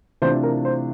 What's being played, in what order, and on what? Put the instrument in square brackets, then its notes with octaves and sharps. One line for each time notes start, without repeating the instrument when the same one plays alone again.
[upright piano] C3 E3 A3 D4 F4 [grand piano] C5
[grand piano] A#4
C5